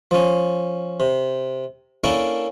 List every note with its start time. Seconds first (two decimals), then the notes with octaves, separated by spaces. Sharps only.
0.11 F3 C#4
1.00 C3
2.04 A#3 C#4 D4 E4 A4 A#4